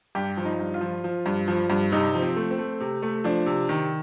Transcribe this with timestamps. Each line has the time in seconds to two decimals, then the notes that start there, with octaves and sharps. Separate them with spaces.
0.15 G2 G4
0.37 F3
0.45 D#4
0.59 G2
0.74 F4
0.81 F3
1.04 F3
1.26 G2
1.48 F3
1.70 G2
1.92 C3 D#4
2.15 F3
2.22 C4
2.36 A3
2.51 C4
2.58 A3
2.80 C3
3.02 A3
3.24 F3 D4
3.46 C3
3.69 D#3